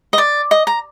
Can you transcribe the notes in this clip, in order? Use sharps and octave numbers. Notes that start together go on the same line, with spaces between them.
D#5
D5
D#5
A#5